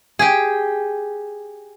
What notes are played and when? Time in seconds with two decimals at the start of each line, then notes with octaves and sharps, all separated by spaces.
0.19 G4 G#4